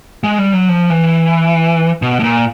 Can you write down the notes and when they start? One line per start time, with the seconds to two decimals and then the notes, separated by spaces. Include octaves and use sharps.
0.24 G#3
0.38 G3
0.53 F#3
0.69 F3
0.90 E3
2.02 B2
2.20 A2
2.24 A#2